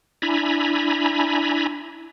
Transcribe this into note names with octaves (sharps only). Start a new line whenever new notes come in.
D4 E4 G#5 A#5 B5